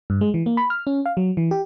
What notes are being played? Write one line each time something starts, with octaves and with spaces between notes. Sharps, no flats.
G2
G#3
E3
A#3
B5
F6
C#4
F5
F#3
E3
G4